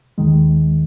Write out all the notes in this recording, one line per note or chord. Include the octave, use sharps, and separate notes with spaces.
D#2 D#3 G#3